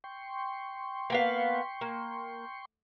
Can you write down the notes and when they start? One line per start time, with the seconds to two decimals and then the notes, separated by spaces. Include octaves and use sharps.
0.04 G5 C6 C#6
1.10 A#3 B3 F5
1.81 A#3